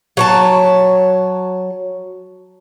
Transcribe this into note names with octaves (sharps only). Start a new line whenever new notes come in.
F#3 C#5 A5